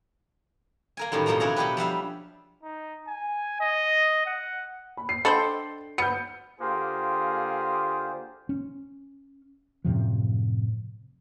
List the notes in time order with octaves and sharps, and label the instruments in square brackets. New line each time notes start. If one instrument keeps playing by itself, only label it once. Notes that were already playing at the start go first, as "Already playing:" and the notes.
[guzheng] A#3 A#4 G#5
F#2 A2 D#3 G3
F2 B2 F3 A#3 A#5
D4 E4 G#4 C#5 D5 A#5
B2 F#3 G4 B4
F3 G3 E5 F5
[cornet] D#4
G#5
D#5
F#5
[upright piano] B5
C7
[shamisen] D3 D#5 B5 [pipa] A4 C5 G5
[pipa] B3 [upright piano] G6 C#7
[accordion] D3 F4 C5 [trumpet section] A#3 G4 G#4
[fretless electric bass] C#4
F#2 A2 C3 F3